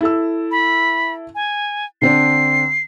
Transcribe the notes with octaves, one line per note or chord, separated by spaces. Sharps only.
E4 A4 E6
B5
G#5
D3 C4 D4 C7